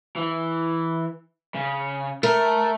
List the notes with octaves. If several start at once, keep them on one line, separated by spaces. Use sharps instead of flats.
E3
C#3
A3 A#4